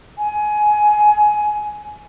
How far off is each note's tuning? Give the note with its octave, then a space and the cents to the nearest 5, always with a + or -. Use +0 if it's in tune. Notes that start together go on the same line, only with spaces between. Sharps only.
G#5 +20